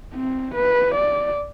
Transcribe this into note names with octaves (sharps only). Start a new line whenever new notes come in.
C4
B4
D5